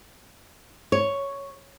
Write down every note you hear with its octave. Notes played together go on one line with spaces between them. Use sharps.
C#5